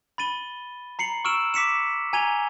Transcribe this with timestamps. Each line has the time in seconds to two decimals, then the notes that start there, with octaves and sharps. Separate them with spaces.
0.18 B5 A6 D#7 G7
0.99 A#5 C7 C#7 F#7
1.25 C#6 E6 F6 D7 E7 F#7
1.54 D6 B6 C#7 E7
2.13 G#5 A#5 G#6 D#7 F7 G7